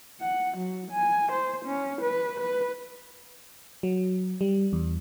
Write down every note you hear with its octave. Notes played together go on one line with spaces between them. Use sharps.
F#5
F#3
G#5
C5
C#4
B4
B4
F#3
G3
E2